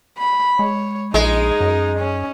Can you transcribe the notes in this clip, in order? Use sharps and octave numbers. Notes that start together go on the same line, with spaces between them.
B5
G#3 C#5
A#1 G#3 D#4
F#2
C#4